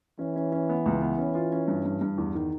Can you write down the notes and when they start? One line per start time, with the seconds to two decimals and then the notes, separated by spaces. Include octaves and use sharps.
0.19 E3 C#4
0.36 C#4
0.52 C#4
0.69 B3
0.86 C#2
1.01 B3
1.19 C#4
1.35 F4
1.52 C#4
1.68 G2
1.85 G2
2.01 G2
2.18 E2
2.35 D#3